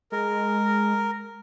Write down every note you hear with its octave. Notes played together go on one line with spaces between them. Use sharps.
G#3 A#4